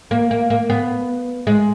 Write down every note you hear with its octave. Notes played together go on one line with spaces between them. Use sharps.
A#3
A#3
A#3
B3
G#3